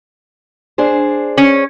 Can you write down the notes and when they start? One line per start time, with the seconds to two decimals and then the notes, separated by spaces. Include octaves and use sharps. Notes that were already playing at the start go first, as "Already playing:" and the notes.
0.78 D4 G#4 C5
1.38 C#4